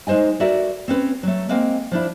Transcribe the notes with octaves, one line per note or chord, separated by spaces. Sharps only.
G#3 D#4 C5 D#5 G#5
F#4 A4 A#4 D5 E5
C4 C#4 B4
F#3 A3
G#3 A#3 C4 F5 G#5
F3 D4 E4